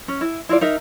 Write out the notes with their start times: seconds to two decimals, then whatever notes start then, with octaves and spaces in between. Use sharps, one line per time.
0.08 C#4
0.21 E4
0.49 E4 F4 D5
0.61 D#4 A#4 E5